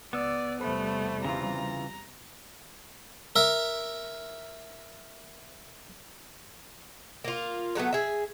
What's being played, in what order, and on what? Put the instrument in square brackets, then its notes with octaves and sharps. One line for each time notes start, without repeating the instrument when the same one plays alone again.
[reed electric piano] C#2 E6 [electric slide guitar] B3 [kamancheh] D5
[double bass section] E2 C3 G3 [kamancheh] A3 [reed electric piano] C5 B5
[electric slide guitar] C#3 E3 F4 [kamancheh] A#5
[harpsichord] A#4 E5
[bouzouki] A#3 F4
D3 F#3 A3 B3
G#4 E5